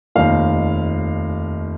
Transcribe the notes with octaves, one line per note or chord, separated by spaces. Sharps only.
F1 D#2 D#3 F5